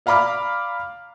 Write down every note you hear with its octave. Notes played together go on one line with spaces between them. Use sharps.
D5 F5 A#5 B5 D6 F6